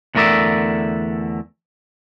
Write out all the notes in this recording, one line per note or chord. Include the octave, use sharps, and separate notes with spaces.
E2 D3 A3 A#4 D5 E5